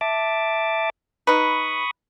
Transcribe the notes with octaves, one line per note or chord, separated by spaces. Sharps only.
E5 A5 D6
D#4 B4 B5 C#6 D#6